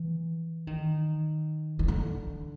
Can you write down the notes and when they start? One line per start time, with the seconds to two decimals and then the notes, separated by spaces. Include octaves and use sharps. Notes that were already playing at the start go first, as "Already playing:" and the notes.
Already playing: E3
0.67 D#3
1.79 D#3
1.88 D3